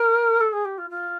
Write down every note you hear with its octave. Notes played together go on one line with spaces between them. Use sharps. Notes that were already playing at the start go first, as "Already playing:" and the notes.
Already playing: A#4
A4
G#4
G4
F4
F4